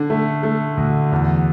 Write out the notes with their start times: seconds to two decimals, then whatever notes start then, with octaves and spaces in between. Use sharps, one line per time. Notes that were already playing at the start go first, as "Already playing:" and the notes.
Already playing: D3
0.10 A3
0.43 A3
0.77 D2
1.12 E2